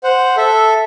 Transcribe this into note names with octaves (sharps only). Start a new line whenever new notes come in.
C5 F#5
A4 E5